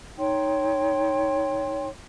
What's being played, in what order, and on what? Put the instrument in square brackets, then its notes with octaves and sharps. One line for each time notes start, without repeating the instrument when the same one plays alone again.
[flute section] D#4 C#5 G5 C6